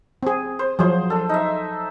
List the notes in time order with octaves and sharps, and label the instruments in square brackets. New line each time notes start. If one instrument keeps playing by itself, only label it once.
[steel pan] C4 G#4
[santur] C5
[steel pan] F3 F#3 [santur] G#4 C5
[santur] D4 A4
D#4 E5